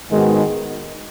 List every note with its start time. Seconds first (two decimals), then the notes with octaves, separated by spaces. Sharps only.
0.09 G#2 D#3 G#3 B3 F#4